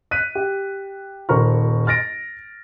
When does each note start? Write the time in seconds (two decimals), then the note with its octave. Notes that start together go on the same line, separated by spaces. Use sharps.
0.11 F#6 B6 D#7
0.35 G4
1.29 D#1 A#4 C5 A#5 C#6 F6
1.87 F6 A6 A#6 D7